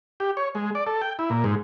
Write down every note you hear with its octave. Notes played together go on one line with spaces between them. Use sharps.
G4
C#5
G#3
D5
A4
G5
E4
A#2
G#2